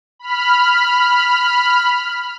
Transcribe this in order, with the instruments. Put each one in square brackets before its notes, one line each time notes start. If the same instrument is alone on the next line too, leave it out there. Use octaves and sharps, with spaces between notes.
[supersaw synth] B5 F6